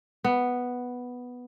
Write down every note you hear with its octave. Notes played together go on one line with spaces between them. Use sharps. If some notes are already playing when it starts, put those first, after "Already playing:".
B3